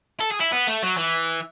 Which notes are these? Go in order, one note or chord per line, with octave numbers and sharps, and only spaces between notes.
A4
G#4
E4
B3
A3
F#3
E3